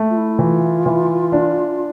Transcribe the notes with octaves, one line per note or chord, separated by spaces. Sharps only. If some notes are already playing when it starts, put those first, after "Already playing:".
Already playing: A3
F4
E4
E3 F4
E3
D4